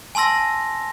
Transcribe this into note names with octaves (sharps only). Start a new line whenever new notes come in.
G#5 A5 C6 E6 A#6